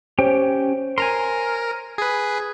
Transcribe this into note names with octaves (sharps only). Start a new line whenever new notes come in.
C#4 G4 C5 C#5 G5
A#4 G#5 A#5 C6
G#4 B4